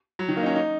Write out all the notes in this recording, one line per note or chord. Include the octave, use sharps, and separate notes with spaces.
F#3
D#3
A#3
D#4
C#4
D#4